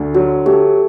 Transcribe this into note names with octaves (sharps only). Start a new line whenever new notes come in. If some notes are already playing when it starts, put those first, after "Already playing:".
Already playing: D2 D3
F#3 F#4
A3 G4